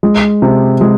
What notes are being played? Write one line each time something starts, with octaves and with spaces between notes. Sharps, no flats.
G#3
C3
G#3